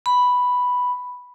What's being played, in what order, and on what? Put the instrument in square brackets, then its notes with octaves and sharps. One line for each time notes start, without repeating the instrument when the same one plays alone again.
[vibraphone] B5